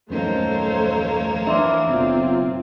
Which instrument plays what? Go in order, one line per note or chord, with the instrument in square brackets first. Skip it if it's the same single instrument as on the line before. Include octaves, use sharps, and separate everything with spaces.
[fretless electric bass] D#1 F#2 D#3 [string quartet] F3 A#3 C#5 [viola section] A3 C5
[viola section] E3 A#4 [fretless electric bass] D4 [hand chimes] E5 C6 D6
[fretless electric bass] F#1 B1 [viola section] C4 F4